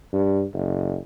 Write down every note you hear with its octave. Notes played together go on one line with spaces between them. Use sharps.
G2
F#1